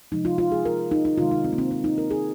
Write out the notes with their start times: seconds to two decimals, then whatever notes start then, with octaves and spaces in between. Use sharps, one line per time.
0.12 C3 F3 G#3 D#4
0.25 F4
0.38 F4
0.52 G#4
0.65 A#4
0.91 D#4
1.05 D#4
1.18 C3 D#3 G#3 F4
1.31 D#4
1.45 C4
1.53 A#3
1.58 C4
1.71 C4
1.84 D#4
1.98 A#4
2.11 G#4